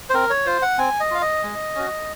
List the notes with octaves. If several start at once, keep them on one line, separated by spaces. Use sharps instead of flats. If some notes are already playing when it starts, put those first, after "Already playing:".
C5
C4 A#4
C#5
F4 C5
F#5
C4 G#5
D#5
F4 F5
D#5
G#3
C#4 F#4